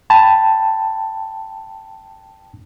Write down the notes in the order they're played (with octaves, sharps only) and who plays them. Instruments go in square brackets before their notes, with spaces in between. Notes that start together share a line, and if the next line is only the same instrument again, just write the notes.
[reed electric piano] G5 A5 B5